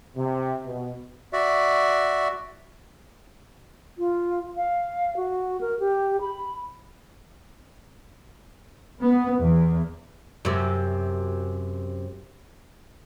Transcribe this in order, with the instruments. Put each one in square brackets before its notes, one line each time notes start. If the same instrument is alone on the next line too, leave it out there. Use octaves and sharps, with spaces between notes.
[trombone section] C3
B2
[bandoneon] F#4 D5 E5
[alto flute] F4
F5
F#4
A#4
G4
B5
[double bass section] B3
E2
[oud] F#2 C3